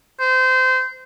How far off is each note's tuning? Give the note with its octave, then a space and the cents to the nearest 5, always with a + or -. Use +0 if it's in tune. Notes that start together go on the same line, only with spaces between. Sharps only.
C5 -25